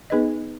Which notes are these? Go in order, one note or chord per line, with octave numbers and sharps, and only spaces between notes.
B3 D#4 G#4 B4 D#5